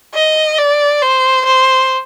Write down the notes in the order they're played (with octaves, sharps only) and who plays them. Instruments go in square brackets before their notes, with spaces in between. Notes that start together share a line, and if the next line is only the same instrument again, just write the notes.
[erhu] D#5
D5
C5
C5